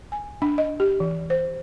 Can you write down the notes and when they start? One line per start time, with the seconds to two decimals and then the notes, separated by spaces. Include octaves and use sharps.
0.12 G#5
0.42 D4
0.58 D#5
0.80 G4
1.00 E3
1.30 C5